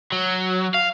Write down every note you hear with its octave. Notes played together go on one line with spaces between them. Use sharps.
F#3
F5